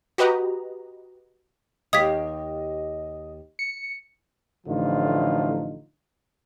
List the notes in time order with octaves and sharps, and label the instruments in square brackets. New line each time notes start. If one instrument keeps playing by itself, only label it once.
[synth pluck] F#4 G4 B4 D#5 A#5
[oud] D#2 G4 F5 [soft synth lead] D#5 [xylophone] D#6 G#6 B6
[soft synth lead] C#7
[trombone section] A1 A2 D3 F3 D#4 F4